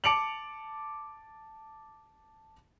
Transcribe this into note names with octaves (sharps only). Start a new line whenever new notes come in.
A5 D6 C#7 D7 F7 F#7